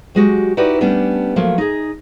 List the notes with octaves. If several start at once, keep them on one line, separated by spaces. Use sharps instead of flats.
F#3 G#3 F#4 G4
D#4 E4 F#4 G4 B4 D5
G3 A3 B3 C#4 D4
F3 F#3 A3 A#3
D#4 G#4